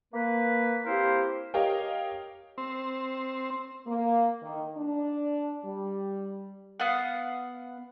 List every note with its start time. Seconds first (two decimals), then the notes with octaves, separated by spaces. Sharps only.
0.14 A#3 B4
0.85 A#3 C4 E4 G4 A#4 C5
1.54 G4 A#4 C#5 D#5 F5 G5
2.58 C4
3.87 A#3
4.42 D#3
4.77 D4
5.65 G3
6.80 B3 F5 F#5